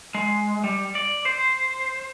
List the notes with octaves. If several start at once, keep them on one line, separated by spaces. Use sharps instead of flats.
G#3
G3
D5
C5